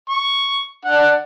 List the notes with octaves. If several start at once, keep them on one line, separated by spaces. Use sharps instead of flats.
C#6
D4 F#5